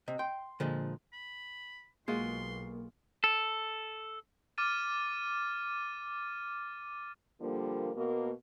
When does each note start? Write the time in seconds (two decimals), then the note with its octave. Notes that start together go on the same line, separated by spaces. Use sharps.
0.08 C3 D#5
0.19 G5 C6
0.60 A#2 D3 F3 G#3
1.13 B5
2.08 B1 G#3 A#3 F4 F#4 C6
3.24 A4
4.58 D6 F6 A6 D#7
7.40 D3 F3 G3 A#3
7.95 B2 A#3